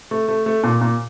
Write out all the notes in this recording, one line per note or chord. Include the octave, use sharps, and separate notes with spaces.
A3
A3
A3
A#2
A#2